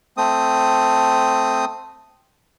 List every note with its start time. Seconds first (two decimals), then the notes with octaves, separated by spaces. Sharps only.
0.17 A3 C4 D#6